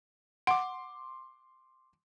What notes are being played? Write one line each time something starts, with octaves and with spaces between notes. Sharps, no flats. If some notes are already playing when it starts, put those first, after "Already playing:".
F#5 C6 D6